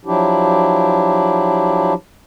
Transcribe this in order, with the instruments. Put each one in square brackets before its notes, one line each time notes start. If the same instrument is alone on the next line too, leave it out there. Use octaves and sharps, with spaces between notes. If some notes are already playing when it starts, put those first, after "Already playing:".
[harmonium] F3 F#3 D4 E4 G4